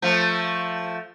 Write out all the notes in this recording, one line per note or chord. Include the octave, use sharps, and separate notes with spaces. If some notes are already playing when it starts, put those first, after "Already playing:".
F3 A3